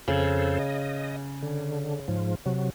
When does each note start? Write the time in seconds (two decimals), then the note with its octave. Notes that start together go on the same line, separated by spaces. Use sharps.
0.08 F2 C#3 A4 C5
0.59 D#5
1.42 D3
2.08 G#2 F3
2.46 C3 F#3